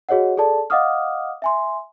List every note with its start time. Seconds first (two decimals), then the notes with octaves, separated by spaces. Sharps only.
0.09 F#4 G#4 C#5 D#5 F#5
0.37 G#4 A4 D5 A5
0.70 D#5 F5 F#5 D6 D#6 F6
1.42 E5 G#5 C6